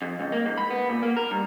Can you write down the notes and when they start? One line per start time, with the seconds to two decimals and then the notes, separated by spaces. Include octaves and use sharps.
0.02 F2
0.20 C#2
0.32 A#3
0.46 G#2
0.57 B5
0.70 B3
0.89 A#2
1.03 A#3
1.17 A#4
1.31 G2